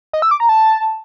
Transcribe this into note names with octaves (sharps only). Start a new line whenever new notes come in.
D#5
E6
D6
A#5
A5